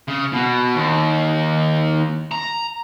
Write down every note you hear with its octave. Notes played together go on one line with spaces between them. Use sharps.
C#3
B2
D#2
A#5